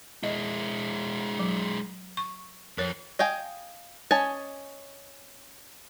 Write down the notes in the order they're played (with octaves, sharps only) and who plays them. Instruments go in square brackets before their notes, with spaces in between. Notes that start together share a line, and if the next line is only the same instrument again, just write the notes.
[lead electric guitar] G#3 E4 [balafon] D#5
[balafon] F#3
C#6
[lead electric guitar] F2 [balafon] A#4 C#5
[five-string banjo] D#5 F5 G5 G#5
C#4 D#5 G#5 A5